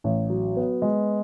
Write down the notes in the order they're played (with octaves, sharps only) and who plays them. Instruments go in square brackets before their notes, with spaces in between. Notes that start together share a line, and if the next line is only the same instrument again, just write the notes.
[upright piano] A1
F#3
B3
G#3